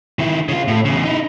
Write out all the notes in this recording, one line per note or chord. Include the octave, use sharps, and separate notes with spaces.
D#3 E4
C#3 F4
A2
E2 C#3
D#4 E4